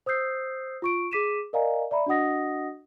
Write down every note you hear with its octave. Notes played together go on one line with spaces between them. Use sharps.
C5 D#6 E6 G6 C7
F4 C#6 D7
G#4 D6 B6 D#7 E7
A#4 D5 D#5 F5 G#5 A#5
D5 E5 A#5 B5
D4 F#4 D#5 F#5 D#6 A#6